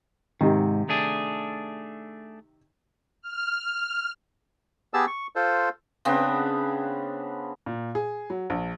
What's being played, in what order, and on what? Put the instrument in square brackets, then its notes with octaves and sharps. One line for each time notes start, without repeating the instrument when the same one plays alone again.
[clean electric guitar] G#2 [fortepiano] C3 D#3
[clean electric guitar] A3 D4 G#4
[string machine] F6
[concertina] B3 G4 G#4 A5 E6
C#6
F4 A4 C5
[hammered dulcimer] C#3 B3 C4 D4
[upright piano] A#2
G#4
F#3
A#1